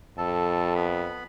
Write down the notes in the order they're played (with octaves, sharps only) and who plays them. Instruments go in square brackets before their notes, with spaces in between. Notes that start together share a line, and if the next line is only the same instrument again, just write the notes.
[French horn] F2 [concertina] A4 A5
[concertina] B3 B5